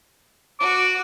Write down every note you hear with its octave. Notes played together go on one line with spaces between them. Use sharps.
F#4 D6